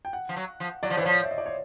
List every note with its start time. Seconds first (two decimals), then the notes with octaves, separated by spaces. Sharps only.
0.05 G5
0.13 F#5
0.29 F3
0.37 F#3
0.60 F3
0.83 F#3 D5
0.90 F3 C#5
0.97 E3 C5
1.05 F3 C#5
1.23 E5
1.31 D#5
1.38 D5
1.46 C#5